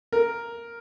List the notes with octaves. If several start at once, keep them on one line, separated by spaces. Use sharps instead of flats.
A#4